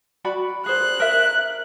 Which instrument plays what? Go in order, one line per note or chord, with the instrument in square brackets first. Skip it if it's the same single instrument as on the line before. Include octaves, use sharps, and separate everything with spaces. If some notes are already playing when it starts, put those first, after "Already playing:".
[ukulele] F#4 D5 B5
[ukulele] G#4 C5 [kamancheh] F#6
[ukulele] A#4 E5